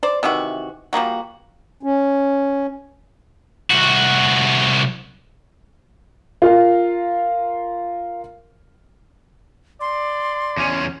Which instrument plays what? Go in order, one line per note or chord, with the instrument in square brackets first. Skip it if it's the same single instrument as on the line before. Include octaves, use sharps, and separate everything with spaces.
[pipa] C5 D5
C3 D#3 E3 F#4
F3 G3 A#3 F#4
[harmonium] C#4
[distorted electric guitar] C2 F#4
[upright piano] F4 A#4 F5
[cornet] D5 [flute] C6
[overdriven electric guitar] E2 C#4